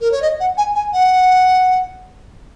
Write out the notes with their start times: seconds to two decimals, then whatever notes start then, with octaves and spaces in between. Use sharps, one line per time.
0.01 A#4
0.12 C#5
0.22 D#5
0.40 F#5
0.57 G#5
0.75 G#5
0.93 F#5